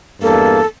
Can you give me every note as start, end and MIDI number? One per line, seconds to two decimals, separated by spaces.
0.22 0.60 40
0.22 0.60 43
0.22 0.60 58
0.22 0.67 69